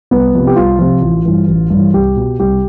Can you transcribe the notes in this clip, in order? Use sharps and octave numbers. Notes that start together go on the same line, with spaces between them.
C2 B3
C3 F3
G4
C2 F4
C3 F3
A1
G2 E3
A1
G2 E3
C2 G4
B2
C2 G4